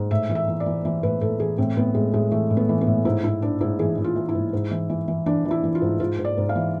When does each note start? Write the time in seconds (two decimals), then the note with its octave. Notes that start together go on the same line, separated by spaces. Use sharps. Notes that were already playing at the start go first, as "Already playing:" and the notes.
Already playing: G#2
0.11 A2 E5
0.29 E3
0.35 E5
0.48 E3
0.60 D5
0.66 E3
0.85 E3
1.03 A2 B4
1.21 A2 A4
1.40 E3 G#4
1.58 A2 C4
1.76 A2 B3
1.95 A2 G#3
2.14 A2 G#3
2.32 E3 A3
2.50 A2
2.57 B3
2.69 E3
2.81 B3
2.87 A2
3.05 G#2 E4
3.24 G#2 E4
3.42 G#2 D4
3.61 G#2 E4
3.79 E3 G#4
3.98 E3
4.04 F4
4.16 E3
4.29 E4
4.35 G#2
4.53 G#2
4.71 E3
4.89 E3
5.08 E3
5.26 E3 D4
5.45 E3
5.51 E4
5.63 E3
5.75 F4
5.82 G#2
6.00 G#2 F4
6.19 G#2
6.25 D5
6.37 G#2
6.49 F5
6.55 E3